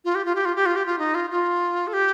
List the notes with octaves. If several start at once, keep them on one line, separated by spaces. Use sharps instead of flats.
F4
G4
F4
G4
F4
G4
F4
G4
F4
D#4
F4
F4
A4
G4